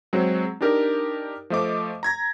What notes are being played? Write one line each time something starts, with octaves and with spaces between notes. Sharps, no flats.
F#3 G#3 C4
D4 D#4 G4 A#4
F3 A3 D#5 D6
A#5 G#6 A#6